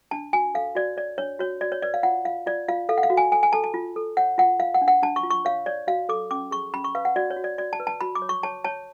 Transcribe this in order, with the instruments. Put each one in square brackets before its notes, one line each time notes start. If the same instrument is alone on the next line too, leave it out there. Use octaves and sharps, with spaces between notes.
[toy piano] D4 A5
F#4 G#5
A4 F5
F#4 D5
C#5 D5
D4 C#5
F#4 C#5
F#4 D5
C#5
B4 D5
F5
F4 F#5
F4 F5
F4 D5
F4 F5
A4 F5
F#5
F5
F#4
G#5
A4 G#5
G#5
A4 A5
A5
F4
A4
C#5 F#5
F4 F#5
F4 F5
F#5
D4
F#5
D4 A5
C#6
F4
C#6
C#5 F5
C#5 D5
F#4 F5
A4 D6
C#4 D6
G#4 C#6
C#4 B5
C#6
B4 F5
F#5
F#4 D5
C#5
F#4
D5
F#4 D5
A5
B4
A5
F#4 B5
D6
C#5
C#6
C#5 A5
C#5 A5